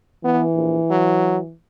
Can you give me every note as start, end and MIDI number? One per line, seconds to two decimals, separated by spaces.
0.24 1.54 52
0.24 0.43 59
0.55 0.78 34
0.90 1.38 54